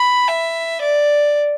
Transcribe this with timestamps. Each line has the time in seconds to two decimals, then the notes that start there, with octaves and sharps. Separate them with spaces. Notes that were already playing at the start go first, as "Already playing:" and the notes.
Already playing: B5
0.28 E5
0.82 D5